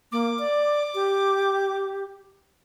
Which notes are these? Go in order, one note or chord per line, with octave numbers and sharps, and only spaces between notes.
A#3 D6
D5
G4